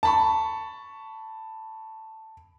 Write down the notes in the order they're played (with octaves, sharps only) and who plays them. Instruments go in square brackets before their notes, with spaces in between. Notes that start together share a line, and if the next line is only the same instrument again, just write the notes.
[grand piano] A5 B5 C#6